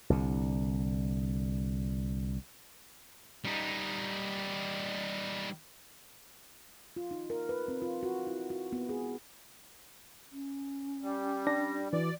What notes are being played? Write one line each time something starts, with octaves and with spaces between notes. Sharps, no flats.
C2 D3
G3 D#4
F4
D#4
A#4
B4
C4
F4
F#4
E4
F#4
B3
G#4
C#4
G3
D4 A#6
E3 F#4 D5